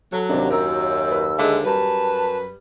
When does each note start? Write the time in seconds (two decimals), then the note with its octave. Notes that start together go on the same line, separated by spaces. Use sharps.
0.12 F#3 A4
0.29 D#2 C3 D4
0.51 F#2 A#4 E6
1.11 B4
1.39 D3 G#3 G#4 E5
1.65 F#2 G3 B4 A5